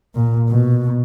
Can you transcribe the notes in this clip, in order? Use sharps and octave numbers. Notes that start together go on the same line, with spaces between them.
A#2
B2